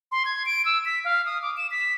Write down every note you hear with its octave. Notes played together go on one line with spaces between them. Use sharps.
C6
G#6
D7
E6
B6
F5
D#6
D6
E7
B6